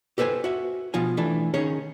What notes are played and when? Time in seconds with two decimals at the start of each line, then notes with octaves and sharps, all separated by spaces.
0.18 G4 A4 B4 C5 G#5
0.44 F#4 E5
0.94 B2 F3 F4 G#5
1.17 E3 A3 D4 A4
1.54 D#3 C#4 G#4 C#5